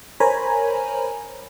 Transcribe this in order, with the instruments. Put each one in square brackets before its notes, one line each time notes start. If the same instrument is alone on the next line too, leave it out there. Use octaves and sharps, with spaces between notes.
[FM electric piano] A#4 C5 C#5 G#5 A#5 B5